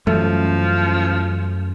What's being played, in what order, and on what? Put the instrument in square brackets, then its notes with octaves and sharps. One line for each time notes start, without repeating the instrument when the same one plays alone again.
[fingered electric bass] F#2 [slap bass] E3 G3 C#4 [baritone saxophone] F3 [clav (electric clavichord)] A3